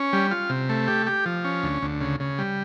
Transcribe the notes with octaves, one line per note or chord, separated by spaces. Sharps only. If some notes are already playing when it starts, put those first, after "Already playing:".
Already playing: C#4
G3
F4
C3
A3
G4
G4
F3
C#4
D2
D2
C#3
C#3
G3